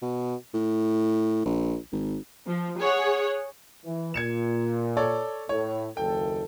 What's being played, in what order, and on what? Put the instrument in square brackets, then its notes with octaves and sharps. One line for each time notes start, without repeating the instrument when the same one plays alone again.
[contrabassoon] B2
A2
A#1
G#1
[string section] F3
G#4 C#5 F#5
[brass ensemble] E3
[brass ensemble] A#2 [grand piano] G#6 C#7 E7
[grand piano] A4 C#5 D5
[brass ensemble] A2 [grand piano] C#5
[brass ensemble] F#1 D#2 A4 [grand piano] G5